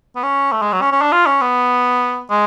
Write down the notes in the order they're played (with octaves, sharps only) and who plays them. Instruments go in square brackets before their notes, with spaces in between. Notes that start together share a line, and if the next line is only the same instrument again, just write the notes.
[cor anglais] B3
C#4
A3
G#3
F#3
C#4
C#4
D4
F4
C#4
B3
G#3